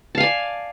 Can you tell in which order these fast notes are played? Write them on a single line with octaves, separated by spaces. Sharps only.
A5 F5 G#5 D5